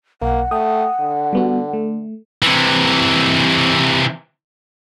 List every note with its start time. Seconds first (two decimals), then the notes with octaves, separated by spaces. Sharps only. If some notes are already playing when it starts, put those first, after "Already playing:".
0.22 B1 A#3 F#5
0.51 A3 G5 D#6
1.00 D3
1.33 G3 B3 F#4
1.73 A3
2.43 C3 E3